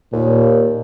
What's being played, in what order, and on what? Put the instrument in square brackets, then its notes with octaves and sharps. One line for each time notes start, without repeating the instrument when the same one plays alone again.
[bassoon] D#2 [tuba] A#2